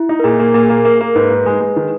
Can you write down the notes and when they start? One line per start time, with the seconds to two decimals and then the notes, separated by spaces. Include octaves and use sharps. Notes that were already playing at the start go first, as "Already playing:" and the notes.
Already playing: E4
0.09 D#4
0.20 A#4
0.24 A#2 G#4
0.39 A#3
0.54 A#2 A#4
0.62 G#4
0.69 A#3 A#4
0.85 A#3
1.01 A#3
1.15 G#2 B4
1.31 D#4
1.46 G#3
1.61 G#3
1.76 D#3